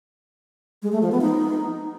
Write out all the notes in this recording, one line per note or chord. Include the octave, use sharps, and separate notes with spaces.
G#3
A3
F3
B3
D#4